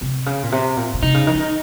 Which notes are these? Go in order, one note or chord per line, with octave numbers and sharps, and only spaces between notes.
C3
C#3
A#2
C3
A#2
A#2
C3 D#4
C#3
D#3
F3
D#3